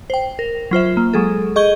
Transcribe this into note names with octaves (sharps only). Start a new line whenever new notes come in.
C5 G5
A#4
F#3 F4 C5 E5
A#3
F#3 G#3 G#4 A4
G#4 D#5 C#6 G6 G#6 G7